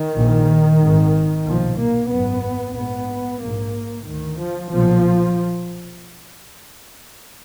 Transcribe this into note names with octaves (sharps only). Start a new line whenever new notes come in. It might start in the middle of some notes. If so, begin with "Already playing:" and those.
Already playing: D#3
A#1 A#2
G#1 G#2
B1 A#2 F3
A#3
G#1 F#2 B3
A#1 G#2 B3
A#1 G#2 A#3
D2 D#3
F3
B1 A#2 F3